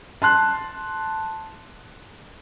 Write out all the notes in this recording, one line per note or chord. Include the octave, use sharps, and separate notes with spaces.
A5 C6 F#6